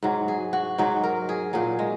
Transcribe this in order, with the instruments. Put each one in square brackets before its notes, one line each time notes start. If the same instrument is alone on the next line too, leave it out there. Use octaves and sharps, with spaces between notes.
[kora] G#2 F#3
G#4
F#4
G#2 F#3 D#4
A#4
G#4
A#2 F#3 G#4
G#3